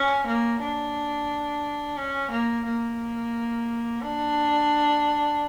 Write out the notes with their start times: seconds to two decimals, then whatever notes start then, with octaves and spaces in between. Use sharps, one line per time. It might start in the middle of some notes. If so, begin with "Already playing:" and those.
Already playing: C#4
0.27 A#3
0.60 D4
1.97 C#4
2.31 A#3
2.65 A#3
4.01 D4